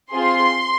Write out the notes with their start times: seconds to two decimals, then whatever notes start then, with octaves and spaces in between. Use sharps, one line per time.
0.12 C4 F4 G#4 C6